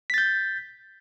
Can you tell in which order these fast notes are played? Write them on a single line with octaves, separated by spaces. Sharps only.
B6 A6 G6